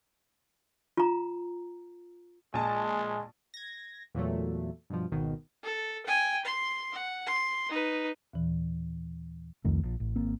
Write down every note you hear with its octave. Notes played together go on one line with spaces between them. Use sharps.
F4 A#5
A#1 G#3 G#5 A5
G#6 A#6
E2 A#2 F#3 A3
G2 B2 F3
G#1 B2 D#3
A4
G5 G#5
C6
F#5
C6
D#4 B4
D#2 A#2 E3
C2 F2 D#3 A3
A#1
A1
G#1 A#3 C4